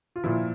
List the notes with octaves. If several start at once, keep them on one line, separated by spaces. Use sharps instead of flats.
F4
A#2 F3 E4